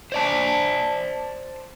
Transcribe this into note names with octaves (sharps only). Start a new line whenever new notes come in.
C5 D5 A5